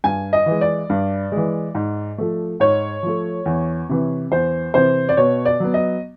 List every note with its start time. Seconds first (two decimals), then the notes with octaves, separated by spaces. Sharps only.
0.04 G2 G#5
0.33 D#5
0.46 E3
0.51 G#3
0.61 D5
0.90 G2
1.32 E3 G#3
1.75 G#2
2.18 F3 A3
2.60 G#2 C#5
3.03 F3 A3
3.46 E2
3.89 C3 E3
4.31 E2 C5
4.74 C3 E3 C5
5.09 D5
5.17 B2 C#5
5.45 D5
5.60 F#3 B3
5.74 D#5